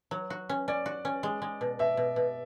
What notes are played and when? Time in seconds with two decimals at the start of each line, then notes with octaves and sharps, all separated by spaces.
0.11 F#3
0.30 F#4
0.49 C#4
0.68 C#4 D5
0.86 F#4
1.05 C#4
1.23 G#3
1.42 G#3
1.61 B2
1.79 B2 E5
1.97 B2
2.16 B2